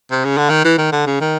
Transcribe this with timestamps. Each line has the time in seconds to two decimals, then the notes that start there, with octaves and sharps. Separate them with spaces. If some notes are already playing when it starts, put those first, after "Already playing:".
0.11 C3
0.25 C#3
0.37 D3
0.50 D#3
0.64 E3
0.78 D#3
0.92 D3
1.07 C#3
1.21 D#3